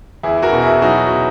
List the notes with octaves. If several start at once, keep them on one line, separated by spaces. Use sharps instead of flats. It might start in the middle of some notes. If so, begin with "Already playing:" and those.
E2 E4 G#4
F#4 A#4
B2
E4 G#4
F#3 D#4 F#4
B2